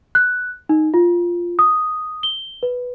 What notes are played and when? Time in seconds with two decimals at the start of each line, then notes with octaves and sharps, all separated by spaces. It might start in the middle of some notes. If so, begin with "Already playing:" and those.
0.15 F#6
0.69 D#4
0.94 F4
1.59 D#6
2.23 G7
2.63 B4